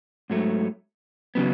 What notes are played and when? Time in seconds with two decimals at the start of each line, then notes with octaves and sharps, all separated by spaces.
0.30 G#2 F#3 A3
1.35 C#3 F#3 B3